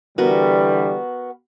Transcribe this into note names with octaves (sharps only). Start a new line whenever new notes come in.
D3 E3 G3 B3 F#4 A#4